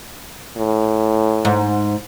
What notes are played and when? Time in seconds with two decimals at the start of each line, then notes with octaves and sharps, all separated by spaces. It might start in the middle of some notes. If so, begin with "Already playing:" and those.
0.57 A2
1.45 G#2